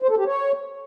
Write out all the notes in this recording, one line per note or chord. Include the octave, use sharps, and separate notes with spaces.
C5
A4
G4
C#5